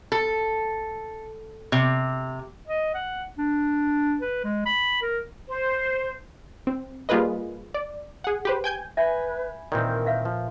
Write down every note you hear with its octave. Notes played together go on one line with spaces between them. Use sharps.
A4
C3
D#5
F#5
D4
B4
G#3
B5
A#4
C5
C4
G3 A#3 F4 G#4 B4 D#5
D5
G#4 F#5
G4 B4 C5
G5 G#5 G6 G#6
B4 E5 G#5 B5 G6
A#2 D#3 E3 C4 A#4 D5 G6 C#7
B4 E5 F5
F3